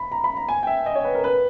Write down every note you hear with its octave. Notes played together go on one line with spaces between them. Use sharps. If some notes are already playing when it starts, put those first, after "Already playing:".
Already playing: B5
A#5
B5
A#5
G#5
G5
E5
D#5
C#5
B4
A#4
B4